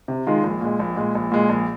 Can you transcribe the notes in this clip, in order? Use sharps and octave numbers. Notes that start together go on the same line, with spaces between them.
C3
D#3 G#3 F4
A#1
A#2 G#3
A#1
A#2 G#3
A#1
A#2 G#3
A#1